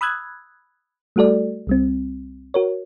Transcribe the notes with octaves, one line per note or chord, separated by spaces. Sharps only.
B5 D#6 E6 F#6 G#6
G3 A3 F#4 A4 D5
C2 G3 C4
F#4 A#4 C#5